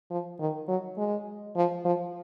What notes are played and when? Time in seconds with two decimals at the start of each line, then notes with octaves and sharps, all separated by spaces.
0.11 F3
0.40 D#3
0.68 F#3
0.98 G#3
1.56 F3
1.85 F3